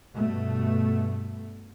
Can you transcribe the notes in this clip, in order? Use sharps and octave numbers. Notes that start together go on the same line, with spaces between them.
G2 B2 A3